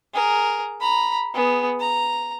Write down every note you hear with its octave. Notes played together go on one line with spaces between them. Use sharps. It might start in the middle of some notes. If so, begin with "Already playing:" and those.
G#4 A#4
A#5 B5
B3 G#4
A#5